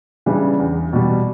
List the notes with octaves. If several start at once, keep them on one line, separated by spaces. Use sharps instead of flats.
C#3 E3 G3 D4
E2
B2 G3